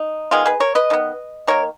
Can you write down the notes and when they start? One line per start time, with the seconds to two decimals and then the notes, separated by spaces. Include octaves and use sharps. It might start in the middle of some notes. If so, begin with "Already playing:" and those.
Already playing: D#4
0.31 D#3 G#3 B3 F4 G#4
0.46 G#4 B4
0.60 A#4 C#5
0.75 B4 D#5
0.90 D#3 F#3 B3
1.47 D#3 A#3 A#4 C#5